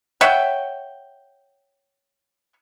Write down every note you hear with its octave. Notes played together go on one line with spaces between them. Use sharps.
C#5 E5 F#5 G5